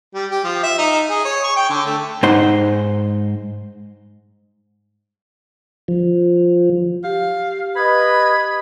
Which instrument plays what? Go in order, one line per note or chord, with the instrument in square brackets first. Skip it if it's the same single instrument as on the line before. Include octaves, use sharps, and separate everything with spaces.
[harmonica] G3
G4
F3
E5
D#4
G#4
C#5
C#6
G5
D3
A3
[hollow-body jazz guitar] G#2 D#4 C5 F#5 C6
[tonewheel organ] F3
[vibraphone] G4 [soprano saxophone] F5
[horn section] B4 D#5 [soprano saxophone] B5 [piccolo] G#6